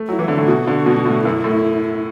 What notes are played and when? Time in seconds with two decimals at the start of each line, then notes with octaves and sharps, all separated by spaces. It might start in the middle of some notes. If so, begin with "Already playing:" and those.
Already playing: A3
0.09 F#3 E4
0.19 E3
0.28 D3
0.38 A2
0.48 B2 F#4
0.67 D3
0.86 B2
0.97 B2
1.06 A2
1.25 F#2 E4
1.44 A2